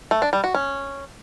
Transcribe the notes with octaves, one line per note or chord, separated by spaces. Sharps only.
A3
D4
G3
F#4
C#4